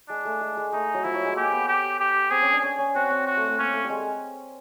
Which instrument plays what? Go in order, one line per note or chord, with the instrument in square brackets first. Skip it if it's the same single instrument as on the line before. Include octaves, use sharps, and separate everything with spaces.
[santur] G#3 [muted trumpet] D4
[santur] A3
G#3
G#3
[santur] A3 [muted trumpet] D#4
[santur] F#3
[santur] F3 [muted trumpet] E4
[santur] F#3
G#3
[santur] A#3 [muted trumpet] G4
[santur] B3
[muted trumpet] G4
G4
[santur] C4 [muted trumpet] G#4
[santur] C#4
D4
C#4
C#4
[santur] C4 [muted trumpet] F#4
[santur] C4
[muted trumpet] F#4
[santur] A3
A3
[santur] A#3 [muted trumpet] C#4
[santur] A3
G3
G#3